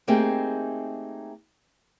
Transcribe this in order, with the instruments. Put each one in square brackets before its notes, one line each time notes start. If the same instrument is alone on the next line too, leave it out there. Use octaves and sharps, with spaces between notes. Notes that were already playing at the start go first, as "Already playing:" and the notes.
[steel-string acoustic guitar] A3 A#3 C4 D#4 G4 G#4